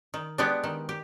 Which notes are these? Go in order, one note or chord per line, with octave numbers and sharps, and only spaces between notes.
D#3
G#3 B3 D4 G4
D#3
G4